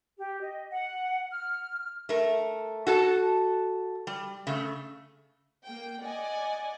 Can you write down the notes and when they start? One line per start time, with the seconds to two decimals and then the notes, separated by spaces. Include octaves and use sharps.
0.18 G4
0.41 D#5
0.71 F#5
1.31 F6
2.09 A3 A#4
2.87 F#4 A4 A5
4.07 G3
4.47 C#3 A3
5.64 A#3 G5
6.02 D5 D#5 F#5 G#5